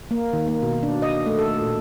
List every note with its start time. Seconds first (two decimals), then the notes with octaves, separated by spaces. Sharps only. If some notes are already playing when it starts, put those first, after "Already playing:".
0.11 A#3
0.33 D#3
0.48 A#3
0.62 B2
0.83 D4
1.02 D#5
1.26 A3
1.39 A4
1.61 A#2